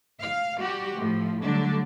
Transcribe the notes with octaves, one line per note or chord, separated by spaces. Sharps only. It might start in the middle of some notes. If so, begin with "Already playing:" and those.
F5
G3 F#4 G4
A2 F3
D3 F#3 G3 A3 D4